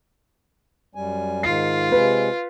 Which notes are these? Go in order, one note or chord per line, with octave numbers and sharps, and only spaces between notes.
F#2 G3 G#5
G#2 D#3 F4 C7
C3 G#3 B4